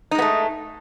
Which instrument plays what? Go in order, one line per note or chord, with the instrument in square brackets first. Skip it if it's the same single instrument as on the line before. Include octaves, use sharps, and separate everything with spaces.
[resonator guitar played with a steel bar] D#4
G#3
B3
A3